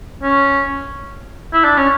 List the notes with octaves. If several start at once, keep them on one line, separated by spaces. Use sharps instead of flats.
C#4
E4
D4
C#4